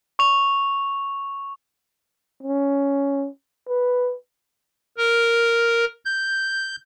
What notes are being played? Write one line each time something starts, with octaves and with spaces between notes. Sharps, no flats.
C#6 F7
C#4
B4
A#4
G6